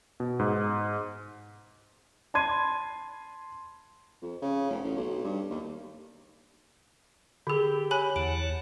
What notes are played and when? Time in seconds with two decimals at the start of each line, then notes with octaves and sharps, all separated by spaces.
0.20 B2
0.39 G#2
2.34 A5 B5 C6 G#6 D#7
4.22 F2
4.42 C#3
4.70 F1
4.83 A1
4.96 B1
5.24 G2
5.50 D#2
7.47 D3 G4 G#4
7.91 C#5 G#5 B5 F#6
8.16 E2 F#5 A5 D7